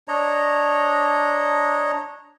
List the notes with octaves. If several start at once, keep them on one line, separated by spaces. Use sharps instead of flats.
D4 C#5 D#5 A#5